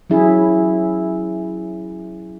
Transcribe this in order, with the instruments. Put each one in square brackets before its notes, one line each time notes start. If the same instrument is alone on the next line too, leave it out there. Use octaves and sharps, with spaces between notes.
[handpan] F#3 C#4 E4 G#4